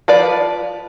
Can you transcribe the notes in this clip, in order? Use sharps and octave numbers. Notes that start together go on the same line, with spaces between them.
F3 B4 D5